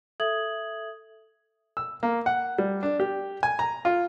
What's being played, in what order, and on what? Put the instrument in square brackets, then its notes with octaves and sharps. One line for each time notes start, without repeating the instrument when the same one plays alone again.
[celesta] A4 E5 D#6 G#6 F#7
[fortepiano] E6
A#3
F#5
G3
D4
G4
G#5
A#5
F4